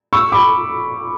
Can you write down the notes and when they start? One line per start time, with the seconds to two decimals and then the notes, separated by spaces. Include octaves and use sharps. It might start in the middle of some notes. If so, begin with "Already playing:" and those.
0.13 C#6 E6
0.32 B5 D6